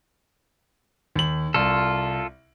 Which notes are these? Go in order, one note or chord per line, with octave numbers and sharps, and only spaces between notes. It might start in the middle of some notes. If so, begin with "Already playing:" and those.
D#2 F#7
C2 F4 A4